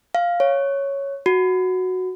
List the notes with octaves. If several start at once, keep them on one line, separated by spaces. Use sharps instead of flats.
F5
C#5
F#4